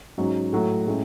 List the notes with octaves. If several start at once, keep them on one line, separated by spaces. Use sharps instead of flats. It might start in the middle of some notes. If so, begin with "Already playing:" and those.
G#2 F#3 C#4 F#4
A2 F#3 A3
A2 G#3 C#4